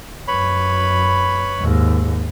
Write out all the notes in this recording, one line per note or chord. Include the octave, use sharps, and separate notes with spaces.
F#2 B4 C#5 B5
D#2 G#2